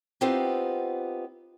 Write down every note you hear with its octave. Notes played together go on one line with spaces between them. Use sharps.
B3 C4 D#4 F4 G4